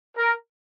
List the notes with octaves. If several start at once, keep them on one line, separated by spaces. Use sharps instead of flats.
A#4